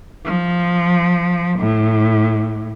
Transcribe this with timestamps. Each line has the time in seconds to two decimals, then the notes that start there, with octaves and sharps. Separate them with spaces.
0.25 F3
1.60 A2